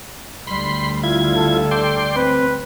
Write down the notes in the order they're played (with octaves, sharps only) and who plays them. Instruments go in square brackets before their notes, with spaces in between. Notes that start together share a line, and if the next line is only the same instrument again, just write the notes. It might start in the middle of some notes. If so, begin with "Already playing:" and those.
[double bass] D2 G3 [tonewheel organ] B5 C6
[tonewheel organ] E4 F4 G#6
[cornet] A4
[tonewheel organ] D5 G5 C6
[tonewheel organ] C4 [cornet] B4